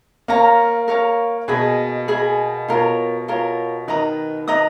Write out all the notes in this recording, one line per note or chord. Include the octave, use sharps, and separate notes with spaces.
A#3 A#4 C#5 F5 A#5
A#4 C#5 F5 A#5
B2 G#4 D#5 G#5 B5
G#4 D#5 G#5 B5
B2 F4 A#4 C#5
F4 A#4 C#5
D#3 B4 D#5 A#5 D#6
B4 D#5 A#5 D#6